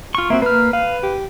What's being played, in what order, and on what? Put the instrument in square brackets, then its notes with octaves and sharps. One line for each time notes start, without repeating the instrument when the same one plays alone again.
[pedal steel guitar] F4 C#6
[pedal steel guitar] A#3 C4 F#4 [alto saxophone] E5
[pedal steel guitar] A#3 F6 [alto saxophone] B4
[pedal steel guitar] B4 [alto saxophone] F5
[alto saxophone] G4